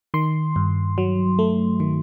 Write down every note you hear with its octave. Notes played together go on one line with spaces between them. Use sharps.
D#3 C6
G2
F#3
A3
D#3